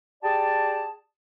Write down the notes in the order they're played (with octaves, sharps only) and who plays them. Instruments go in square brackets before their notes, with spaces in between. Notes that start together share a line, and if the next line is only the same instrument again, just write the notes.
[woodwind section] G4 G#4 D5 A5